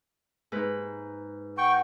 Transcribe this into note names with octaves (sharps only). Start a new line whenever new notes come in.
G#2 B4
F#5 G5 C#6